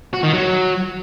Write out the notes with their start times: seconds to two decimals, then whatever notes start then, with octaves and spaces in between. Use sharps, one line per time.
0.13 F#4
0.23 D#3
0.33 F#3